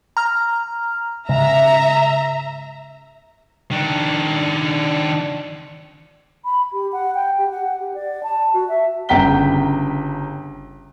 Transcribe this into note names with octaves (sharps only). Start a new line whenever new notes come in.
A#5 F6
G#2 C#3 E5 A#5
D#3 D4
B5
G4
F#5
G5
G4
F#5
G4
D5
A5
F#4
E5
G1 C#3 G5 A#5 B6 G7